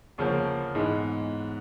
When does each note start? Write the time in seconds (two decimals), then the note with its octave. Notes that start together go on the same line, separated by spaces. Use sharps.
0.18 D2 C#3 F3 A#3
0.75 G#2 E3 G#3 B3